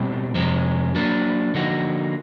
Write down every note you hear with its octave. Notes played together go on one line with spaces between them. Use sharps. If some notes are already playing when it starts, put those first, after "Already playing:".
Already playing: B2 G3 C4
F2 C3 F3 G#3
F#3 A#3 D4
D3 F3 A#3 D#4 F#4